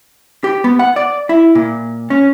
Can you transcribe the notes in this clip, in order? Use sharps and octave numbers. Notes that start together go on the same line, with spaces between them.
G4
B3
F#5
D5
E4
A#2
C#4